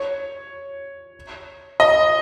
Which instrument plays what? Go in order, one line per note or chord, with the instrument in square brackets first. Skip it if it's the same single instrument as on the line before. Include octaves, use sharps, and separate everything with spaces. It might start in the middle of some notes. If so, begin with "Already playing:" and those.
Already playing: [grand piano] C#5
D#5